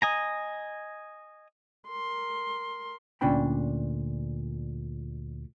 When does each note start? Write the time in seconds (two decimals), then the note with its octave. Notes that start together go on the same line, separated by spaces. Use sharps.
0.02 D#5 G#5 A#5
1.89 A#4 C6
3.21 D2 A#2 C#4 D4 G5 B5